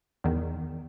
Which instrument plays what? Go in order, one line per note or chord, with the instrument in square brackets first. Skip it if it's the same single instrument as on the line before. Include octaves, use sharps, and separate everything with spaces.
[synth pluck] E2 D#3